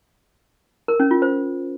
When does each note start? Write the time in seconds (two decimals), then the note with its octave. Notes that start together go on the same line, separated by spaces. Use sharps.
0.88 A#4
1.00 C#4
1.11 F4
1.22 C5